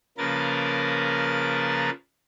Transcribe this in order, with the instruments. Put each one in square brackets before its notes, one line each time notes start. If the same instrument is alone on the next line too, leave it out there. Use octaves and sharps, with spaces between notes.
[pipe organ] C#3 F3 A#3 A#4 B4 A6